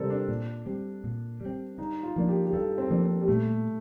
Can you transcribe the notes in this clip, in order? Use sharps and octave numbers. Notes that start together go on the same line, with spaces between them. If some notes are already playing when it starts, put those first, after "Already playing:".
Already playing: C3 G3 C4 A4 A#4
D4
A#2
G3 C4
A#2
G3
C4
G2 D#4
F4
F3 A#3 D4
G4
G4
G2 A4
C4
F3 A#3 D4
C4
G3
A#2 A3